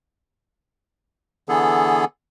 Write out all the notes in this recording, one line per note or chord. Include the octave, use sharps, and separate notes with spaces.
D3 E3 B3 G#4 A4